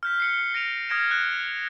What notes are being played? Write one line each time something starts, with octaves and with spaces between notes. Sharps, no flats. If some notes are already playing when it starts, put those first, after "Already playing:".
F6 G6 B6
C7 C#7 G7
A#6 D7 D#7 F7
D#6 F6 G#6 A#6 D7 E7
F#6